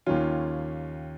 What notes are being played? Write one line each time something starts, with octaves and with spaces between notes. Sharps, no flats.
D#2 D#3 C#4 F4